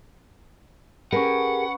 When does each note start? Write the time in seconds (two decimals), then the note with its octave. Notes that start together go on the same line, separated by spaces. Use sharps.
1.12 C#4 G4 G#4 A#4 B4 F#5